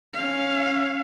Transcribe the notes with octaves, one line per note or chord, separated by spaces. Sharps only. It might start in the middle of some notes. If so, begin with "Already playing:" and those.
C#4 F5